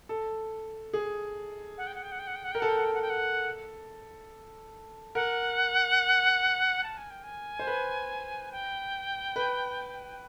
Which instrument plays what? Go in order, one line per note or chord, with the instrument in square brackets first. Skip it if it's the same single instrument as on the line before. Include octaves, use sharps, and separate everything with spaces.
[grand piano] A4
G#4
[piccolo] F#5
G5
F#5
G5
F#5
G5
F#5
G5
F#5
G5
[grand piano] A#4
[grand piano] A4 [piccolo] F#5
[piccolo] G5
F#5
G5
F#5
G5
F#5
[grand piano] A#4 [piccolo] F#5
[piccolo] A5
G#5
G5
G#5
[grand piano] C5
B4
[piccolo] G5
[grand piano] B4